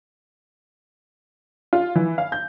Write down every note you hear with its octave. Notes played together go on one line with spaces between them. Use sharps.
F4
E3
F5
G6